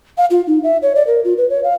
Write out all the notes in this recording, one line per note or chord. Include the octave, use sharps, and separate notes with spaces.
F5
F4
D#4
E5
C#5
D5
A#4
F4
B4
C#5
F5